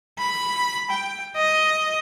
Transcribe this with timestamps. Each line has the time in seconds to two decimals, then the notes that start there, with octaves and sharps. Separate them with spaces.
0.18 B5
0.90 G5
1.36 D#5